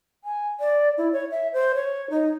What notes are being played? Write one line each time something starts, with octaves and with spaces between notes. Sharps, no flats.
G#5
D5
E4
C#5
E5
C5
C#5
D#4